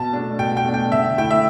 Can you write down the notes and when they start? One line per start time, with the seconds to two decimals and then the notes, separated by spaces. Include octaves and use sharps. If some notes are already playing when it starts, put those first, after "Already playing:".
Already playing: B2 A5
0.13 A3 D4
0.39 B2 G5
0.57 G5
0.65 A3 D4
0.74 G5
0.91 D3 E5
1.17 A3 E4 G5
1.31 E5